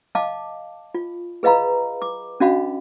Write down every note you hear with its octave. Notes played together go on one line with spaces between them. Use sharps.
D#5 F5 A5 D6
F4
G#4 B4 D#5 F5 A#5 B5
D6
C#4 D4 F#4 D#5 F5 B5